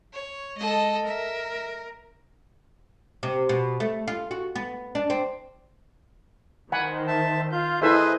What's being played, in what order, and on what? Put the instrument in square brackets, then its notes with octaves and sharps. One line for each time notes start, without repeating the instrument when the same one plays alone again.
[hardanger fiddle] C#5
[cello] G#3 [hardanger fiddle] A4 D#5
[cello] A#4 [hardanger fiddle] E5
[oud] C3
B2
A3
F4
F#4
B3
D4
C4
[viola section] D#3 C5 [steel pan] F#5 G#5 B5
[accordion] E5 A5
[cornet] F4 [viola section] F5 [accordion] G6
[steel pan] E4 A4 E5 [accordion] G#4 B4 G#5 [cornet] C5 [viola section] D#5